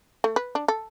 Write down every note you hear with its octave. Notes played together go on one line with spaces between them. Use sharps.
A3
B4
D4
A4